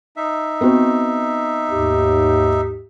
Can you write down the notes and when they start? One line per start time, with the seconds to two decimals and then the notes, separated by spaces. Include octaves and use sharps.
0.17 D#4 E5
0.61 B3 C4 F#4
1.69 D#2 G#2 G4